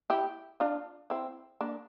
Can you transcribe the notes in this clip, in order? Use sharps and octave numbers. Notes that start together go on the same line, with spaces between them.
E4 G4
D4 F4
C4 E4
A#3 D4